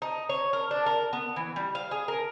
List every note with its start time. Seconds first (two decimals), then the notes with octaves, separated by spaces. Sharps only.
0.02 D#4
0.29 C#5
0.53 A#4
0.71 D4
0.86 A#4
1.13 B3
1.36 E3
1.56 G3
1.75 F5
1.91 G#4
2.08 A#4